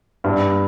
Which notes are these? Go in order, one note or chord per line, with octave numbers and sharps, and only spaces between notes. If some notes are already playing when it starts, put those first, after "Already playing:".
G2